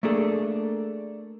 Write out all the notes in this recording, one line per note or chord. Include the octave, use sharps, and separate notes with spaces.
A3 A#3 D4 G#4 A4